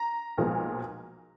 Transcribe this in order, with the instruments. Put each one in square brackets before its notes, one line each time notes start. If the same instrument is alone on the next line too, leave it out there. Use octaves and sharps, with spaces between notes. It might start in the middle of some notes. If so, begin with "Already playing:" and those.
Already playing: [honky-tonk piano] A#5
B1 A#2 F3 G#3 B3